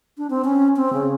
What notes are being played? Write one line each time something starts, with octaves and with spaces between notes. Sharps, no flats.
D4
C4
C#4
C4
C#3